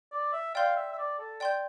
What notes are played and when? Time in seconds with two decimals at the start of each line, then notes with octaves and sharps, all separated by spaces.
0.11 D5
0.32 E5
0.55 D5 F5 G5 C6 G6
0.76 E5
0.92 E5
0.98 D5
1.18 A4
1.40 D5 G5 C6 G6